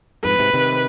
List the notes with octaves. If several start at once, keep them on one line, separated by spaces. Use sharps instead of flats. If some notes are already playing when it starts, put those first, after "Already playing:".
F2 G#2 B4
G#2 C3
C3 D#3